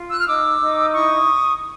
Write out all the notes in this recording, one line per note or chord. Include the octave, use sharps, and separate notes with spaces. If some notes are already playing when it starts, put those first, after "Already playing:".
Already playing: F4
E6 F#6
F6
D#4 D6 E6
D#4
E4 C#6 D#6